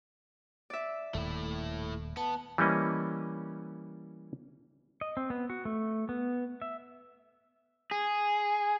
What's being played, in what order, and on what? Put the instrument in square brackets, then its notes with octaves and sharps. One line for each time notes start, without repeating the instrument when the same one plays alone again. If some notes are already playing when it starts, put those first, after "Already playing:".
[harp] D5 E5
[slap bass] D#1 D#2 [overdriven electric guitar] A3 E4
[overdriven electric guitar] B3 [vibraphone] A5
[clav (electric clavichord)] E3 G3 A#3 C#4 D#5
[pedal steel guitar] D#5
C4
B3
F#4
A3
B3
E5
[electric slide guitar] G#4